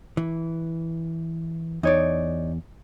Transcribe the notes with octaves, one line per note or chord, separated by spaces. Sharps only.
E3
E2 D#4 C#5 D5